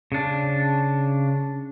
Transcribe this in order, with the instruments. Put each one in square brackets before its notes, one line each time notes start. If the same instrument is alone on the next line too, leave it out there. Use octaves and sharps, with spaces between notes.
[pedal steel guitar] C#3 D4